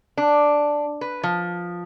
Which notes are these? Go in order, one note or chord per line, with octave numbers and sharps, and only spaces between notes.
D4
B4
F3